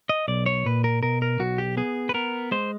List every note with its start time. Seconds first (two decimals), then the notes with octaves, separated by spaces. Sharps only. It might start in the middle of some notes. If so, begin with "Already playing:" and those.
0.09 D#5
0.28 B1 D5
0.46 C#5
0.66 A#2 B4
0.84 A#4
1.03 B2 A#4
1.22 A#4
1.39 B1 F#4
1.58 G4
1.77 B3 G#4
2.09 B4
2.14 B3 A#4
2.51 G#3 C5